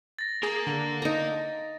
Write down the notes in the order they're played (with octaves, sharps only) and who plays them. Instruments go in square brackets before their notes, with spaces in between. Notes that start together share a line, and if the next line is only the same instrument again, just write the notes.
[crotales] A6 A#6
[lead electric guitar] A#3 A#4 [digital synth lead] G#4
[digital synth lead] D3
[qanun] D#4 A#5